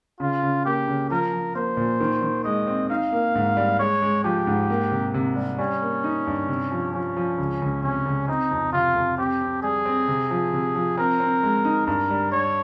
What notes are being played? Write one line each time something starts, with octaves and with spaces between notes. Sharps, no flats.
C#3 F4
C#3
A#3 G4
C#3
F3 A#4
F3
A#3 C5
A#2
D#3
D#3
G#3 D#5
C4
D#4 F5
A#3
G#2
G3
G#3 C#5
G#3
F3 G4
G#2
A#3
C3
C3
G3
G3 C#4
A#3
D#4
G2
C3
F3
F3 C#4
F3
C#2
C#2
C3 C#4
C#2
C4 D#4
F2
C3 F4
F2
C4 G4
C4
G3 G#4
C4
C3
F3
C3
F3
C4 A#4
C4
G#3
D#4
G2 A#4
G3
G3 C#5